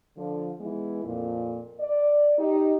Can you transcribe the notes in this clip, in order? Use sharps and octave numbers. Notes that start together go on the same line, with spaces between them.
D3 F3
E3 G#3 B3 E4
F2 A#2
D5
D#4 G4